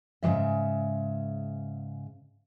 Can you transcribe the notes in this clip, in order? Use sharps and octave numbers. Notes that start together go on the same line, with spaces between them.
G#2 C#3 E3 F3 E5